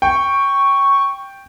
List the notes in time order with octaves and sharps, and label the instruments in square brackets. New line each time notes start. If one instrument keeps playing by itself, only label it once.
[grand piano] G5 [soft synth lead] C#6